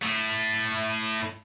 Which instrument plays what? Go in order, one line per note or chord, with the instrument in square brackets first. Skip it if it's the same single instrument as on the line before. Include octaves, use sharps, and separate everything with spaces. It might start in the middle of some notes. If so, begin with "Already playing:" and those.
[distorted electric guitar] A2 A3